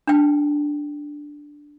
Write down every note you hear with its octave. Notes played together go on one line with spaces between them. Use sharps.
D4 G5